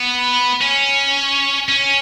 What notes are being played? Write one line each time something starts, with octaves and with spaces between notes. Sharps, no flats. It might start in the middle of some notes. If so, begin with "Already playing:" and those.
Already playing: B3
C#4
C#4